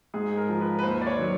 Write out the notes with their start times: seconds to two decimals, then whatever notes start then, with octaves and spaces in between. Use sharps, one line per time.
0.14 G#2 G#4
0.37 A#4
0.49 F3
0.61 B4
0.79 B4
0.83 D#2 C5
1.01 D5
1.07 C#5
1.18 D#3 F#3